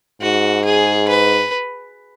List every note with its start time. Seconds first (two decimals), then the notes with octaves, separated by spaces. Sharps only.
0.22 G#2 F#4
0.65 G#4
1.08 B4